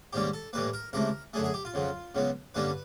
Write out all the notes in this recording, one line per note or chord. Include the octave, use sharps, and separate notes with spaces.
G#2 D#3 G3 A#3 C#4 G4
A4
A2 E3 G3 A#3 B4
A#4
C#2 C3 E3 A3 A#4
F#2 D3 F#3 A3 G#4
G#4
G4
F4
F2 C#3 F#3
C#2 C#3 F#3 B3
G2 D3 G3 A#3 C#4 B4